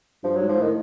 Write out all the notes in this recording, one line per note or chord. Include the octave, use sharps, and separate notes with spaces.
G2 F3
G#2 F#3
F3
A2 D#3